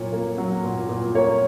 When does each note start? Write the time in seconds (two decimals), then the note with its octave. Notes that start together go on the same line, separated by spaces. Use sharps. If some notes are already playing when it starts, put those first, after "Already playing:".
Already playing: A#2 F#3 C#5
0.12 A#3
0.38 F#3
0.63 A#2
0.89 A#2
1.15 A#3 C#5